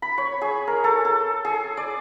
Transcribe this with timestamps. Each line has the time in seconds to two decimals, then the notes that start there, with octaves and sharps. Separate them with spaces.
0.02 B5
0.18 C#5
0.41 G#4
0.67 A#4
0.84 A4
1.05 A4
1.45 G#4
1.77 D5